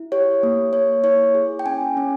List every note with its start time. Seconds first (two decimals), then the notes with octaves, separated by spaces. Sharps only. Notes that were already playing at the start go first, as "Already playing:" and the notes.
Already playing: E4
0.12 G4 C#5
0.43 A#3
0.73 A#3 C#5
1.04 E4 C#5
1.35 G#4
1.59 G5
1.66 C#4 G#5
1.97 C#4